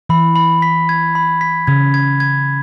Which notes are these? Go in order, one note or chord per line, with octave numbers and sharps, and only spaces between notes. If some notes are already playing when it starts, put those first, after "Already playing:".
E3 B5
B5
B6
G#6
B5
B6
C#3 G#6
G#6
G#6